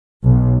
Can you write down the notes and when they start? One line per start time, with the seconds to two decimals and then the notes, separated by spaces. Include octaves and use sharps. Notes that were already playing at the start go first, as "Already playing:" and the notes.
0.24 B1